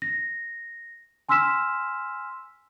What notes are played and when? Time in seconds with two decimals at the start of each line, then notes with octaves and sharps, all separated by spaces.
0.02 A#6
1.29 G#5 C6 E6 F6 B6 E7